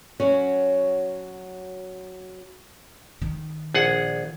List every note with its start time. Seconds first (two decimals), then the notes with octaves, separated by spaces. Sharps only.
0.20 F#3 C#4 F#4
3.22 D#3
3.74 A#1 G#4 F#5